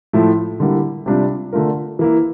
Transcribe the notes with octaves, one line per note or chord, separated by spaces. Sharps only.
A2 F3 A3 E4
D3 G3 A#3 E4
C3 G3 D4 F4
D3 A3 D4 F4 A#4
E3 A#3 E4